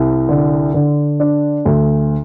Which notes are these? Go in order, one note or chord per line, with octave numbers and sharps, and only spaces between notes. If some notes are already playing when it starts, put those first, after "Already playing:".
Already playing: C2
D3
D3
D4
D2